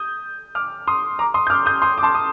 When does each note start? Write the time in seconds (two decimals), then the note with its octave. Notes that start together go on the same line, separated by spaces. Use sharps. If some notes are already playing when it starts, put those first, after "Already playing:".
Already playing: D#6 G6
0.55 D6 F6
0.87 C6 D#6
1.19 A#5 D6
1.34 C6 D#6
1.47 G6
1.50 D6 F6
1.66 D#6 G6
1.82 C6 D#6
1.98 D6
2.03 A5 C6
2.15 D#6